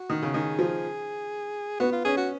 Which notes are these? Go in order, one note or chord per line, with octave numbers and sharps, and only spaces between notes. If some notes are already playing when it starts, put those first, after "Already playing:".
Already playing: F#4
D#3
C#3
D#3 G#4
F3
B3 F#4
F4
C#4 G#4
F#4